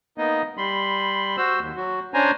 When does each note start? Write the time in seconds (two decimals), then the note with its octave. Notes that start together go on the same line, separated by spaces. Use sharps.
0.18 A#3 B3 D#4 D#5
0.57 G3 B5 C6
1.37 F#4 C5 E6
1.60 D#2
1.76 F#3 F#4
2.14 C#4 D4 C5 G#5 A#5